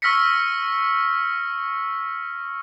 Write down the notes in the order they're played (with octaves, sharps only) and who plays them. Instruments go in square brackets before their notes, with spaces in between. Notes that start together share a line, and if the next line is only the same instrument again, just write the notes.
[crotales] C#6 E6 F6 A#6 B6 C#7